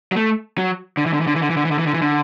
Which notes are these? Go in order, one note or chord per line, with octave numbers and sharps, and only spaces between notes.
F#3
A3
F#3
D3
E3
D3
E3
D3
E3
D3
E3
D3
E3
D3
E3
D3
E3
D3